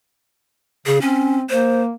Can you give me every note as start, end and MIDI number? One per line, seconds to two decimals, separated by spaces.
0.86 1.00 49
0.86 1.00 68
1.01 1.44 60
1.01 1.37 61
1.50 1.93 58
1.50 1.81 72